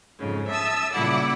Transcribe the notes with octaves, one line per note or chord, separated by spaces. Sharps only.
F2 G#2 C#3
E5 A5 D#6 E6
A#2 C#3 G3 E4 F#5 D6